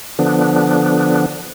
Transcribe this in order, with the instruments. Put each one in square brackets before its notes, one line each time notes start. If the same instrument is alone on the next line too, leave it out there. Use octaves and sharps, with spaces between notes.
[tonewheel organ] D3 F3 B3 D4